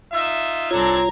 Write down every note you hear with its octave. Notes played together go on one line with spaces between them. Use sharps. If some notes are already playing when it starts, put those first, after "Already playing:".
D#4 F4 E5
C2 C4 D4 F4 A4 C#5 A#5 G#6